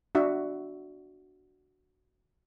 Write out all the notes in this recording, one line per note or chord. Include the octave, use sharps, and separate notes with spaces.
D4 F#4 E5